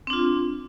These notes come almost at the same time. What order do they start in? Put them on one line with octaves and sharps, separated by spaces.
C4 D4 F4